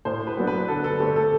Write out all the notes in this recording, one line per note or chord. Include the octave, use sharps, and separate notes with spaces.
A2 C5
B4
F#3 B3 D4
B4
D3 A4
A4
A3 C4 G4
A4